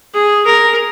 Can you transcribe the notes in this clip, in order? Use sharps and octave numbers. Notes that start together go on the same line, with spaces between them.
G#4
A#4